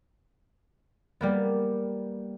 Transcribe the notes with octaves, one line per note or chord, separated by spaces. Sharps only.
G3 A#3 B3